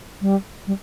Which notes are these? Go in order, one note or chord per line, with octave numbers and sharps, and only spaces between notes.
G3
G3